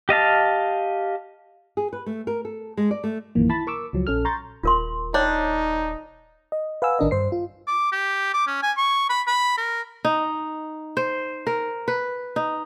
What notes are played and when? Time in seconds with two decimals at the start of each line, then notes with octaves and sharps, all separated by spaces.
0.09 G4 D#5 F5 A5
1.77 G#4
1.93 B4
2.06 A3
2.27 A#4
2.45 A4
2.77 G#3
2.91 D5
3.04 A3
3.35 A#1 F#2 D#3 E3 A#3
3.49 E4 A5 B5 A6
3.67 A#4 C#6 D6 E6
3.93 C#2 F3 F#3
4.07 A#1 C#4 A4 F6
4.25 A#5 C6 C#6 G6 A6
4.63 D#1 F4 A#4 C6
5.14 D4 D#4 C#5 G5
6.52 D#5
6.82 B4 F5 F#5 G#5 E6
6.99 A1 D#3 D4 A#4 D#5
7.11 G2 C5 C7
7.32 F4
7.68 D6
7.92 G4
8.34 D6
8.47 C#4
8.63 G#5
8.77 C#6
9.10 B5
9.27 B5
9.58 A#4
10.05 D#4
10.97 C5
11.47 A#4
11.88 B4
12.36 D#4